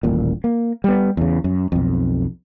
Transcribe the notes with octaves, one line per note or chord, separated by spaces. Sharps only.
D#1 A1 A#2
A#3
G3 B3
E2 C#3
F#2
B1 F2